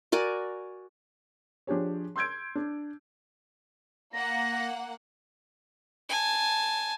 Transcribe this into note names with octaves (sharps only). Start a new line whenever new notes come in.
F#4 A#4 D5 G#5
F3 D4 G4 G#4 C#5
C6 E6 G6 G#6 D7
D4
A#3 F#5 A#6
G#5 A5